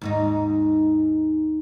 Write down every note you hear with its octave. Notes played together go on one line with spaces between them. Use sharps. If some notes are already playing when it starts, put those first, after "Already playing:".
D#2 G#2 D#4